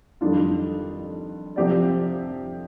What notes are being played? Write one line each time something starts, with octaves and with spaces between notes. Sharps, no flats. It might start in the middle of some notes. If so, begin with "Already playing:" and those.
F2 D#3 G3 D4 F4
C3 F3 C4 G4 D5